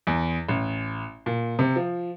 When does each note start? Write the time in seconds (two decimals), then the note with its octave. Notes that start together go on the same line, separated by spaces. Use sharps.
0.07 E2
0.49 A1
1.26 A#2
1.59 C3
1.76 F3